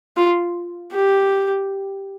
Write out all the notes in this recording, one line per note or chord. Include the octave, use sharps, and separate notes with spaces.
F4
G4